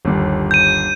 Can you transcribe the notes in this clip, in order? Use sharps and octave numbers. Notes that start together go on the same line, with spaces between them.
G1 D#2
G6 D#7